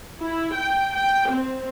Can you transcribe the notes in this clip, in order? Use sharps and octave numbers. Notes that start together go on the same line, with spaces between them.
E4
G5
G5
C4